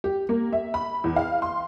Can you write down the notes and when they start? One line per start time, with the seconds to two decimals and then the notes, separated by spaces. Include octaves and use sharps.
0.04 G4
0.29 A#3
0.53 E5
0.74 B5
1.04 E2
1.16 F5
1.42 C6